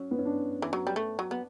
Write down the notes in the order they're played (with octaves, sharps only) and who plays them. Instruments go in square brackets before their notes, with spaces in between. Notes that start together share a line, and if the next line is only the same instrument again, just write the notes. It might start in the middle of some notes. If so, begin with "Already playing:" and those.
Already playing: [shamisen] F#3 [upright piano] C#4
[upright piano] B3
C#4
D4
[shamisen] E3
F#3
G3
A3
F#3
B3